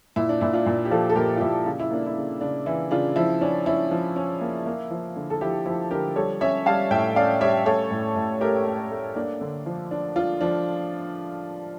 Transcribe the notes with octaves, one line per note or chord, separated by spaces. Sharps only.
A#2 E4
D4
A#2 E4
D4 F4
A#2
G4
F3 F4 A4
A4
A#2 G4 A#4
F4
A#2 E4 G4
C#3 F4
E4
A#3 D4
E4
C#3
C#3 D4
E3 E4
C#3 D4 F4
F3 E4
C#4 D4
C#4 E4
F3
C#4
A#3
A#3
F3
D3
A4
F3 E4 G4
F3 E4
D3 G4 A#4
G3 A4 C#5
C#4 C#5 E5
G3 F5 A5
A2 E5 G5
C#4 D5 F5
G3 C#5 E5
A3 A4 C#5
A2
A2
A3 G4 A#4
A3
A3
A#3 D4
D3
F3
D4
D4 F4
F3 D4